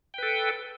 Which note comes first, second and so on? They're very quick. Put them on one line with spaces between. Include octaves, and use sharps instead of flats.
G5 B4 A4